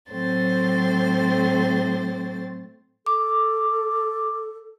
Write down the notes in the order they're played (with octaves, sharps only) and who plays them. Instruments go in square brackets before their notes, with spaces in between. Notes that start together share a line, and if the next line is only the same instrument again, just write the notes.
[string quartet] A2 F#3 C4 A4 C5 A6
[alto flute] A4 [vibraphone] D6